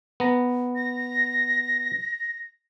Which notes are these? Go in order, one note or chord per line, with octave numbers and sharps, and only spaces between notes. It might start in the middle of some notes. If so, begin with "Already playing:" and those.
B3 A#5
A#6